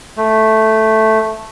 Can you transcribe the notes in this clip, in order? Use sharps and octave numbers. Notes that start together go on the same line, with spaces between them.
A3